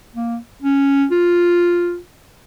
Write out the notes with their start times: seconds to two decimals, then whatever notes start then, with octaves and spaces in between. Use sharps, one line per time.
0.15 A#3
0.62 C#4
1.11 F4